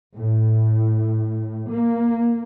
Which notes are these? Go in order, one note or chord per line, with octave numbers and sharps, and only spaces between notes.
A2
A#3